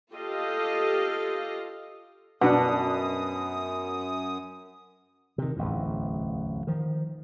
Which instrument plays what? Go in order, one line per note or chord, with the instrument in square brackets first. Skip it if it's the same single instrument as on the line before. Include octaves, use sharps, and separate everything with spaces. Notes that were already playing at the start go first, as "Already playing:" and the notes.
[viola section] F4 G4 A4 D#5 F5
[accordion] F#2 D#6 [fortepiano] B2 [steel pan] D4 F#5
[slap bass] C3 D#3
D1 A1 E2
D#3 F3